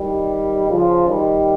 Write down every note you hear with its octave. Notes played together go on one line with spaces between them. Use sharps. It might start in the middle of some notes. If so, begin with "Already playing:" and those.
Already playing: D#3 G3
C#3 F3
D#3 G3